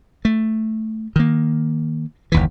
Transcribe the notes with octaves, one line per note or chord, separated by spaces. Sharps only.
A3
D#3 A#3
F#1 D#2 E3